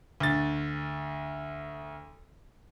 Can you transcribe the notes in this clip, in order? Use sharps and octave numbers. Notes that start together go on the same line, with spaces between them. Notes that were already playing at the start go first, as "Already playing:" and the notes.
D2 A6